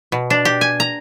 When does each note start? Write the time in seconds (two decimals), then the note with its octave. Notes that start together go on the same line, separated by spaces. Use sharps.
0.12 B2
0.30 D4
0.45 G4
0.61 G#5
0.80 A#5